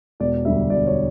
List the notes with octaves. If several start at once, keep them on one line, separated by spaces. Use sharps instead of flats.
E1 D5
D2 D3 G3 E5
E1 D5
C#5